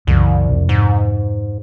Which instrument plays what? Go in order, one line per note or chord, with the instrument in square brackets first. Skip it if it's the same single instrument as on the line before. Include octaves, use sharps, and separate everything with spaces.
[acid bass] C2 [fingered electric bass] F#2 C#3 E3
[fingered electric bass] F2 C3
[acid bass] G#2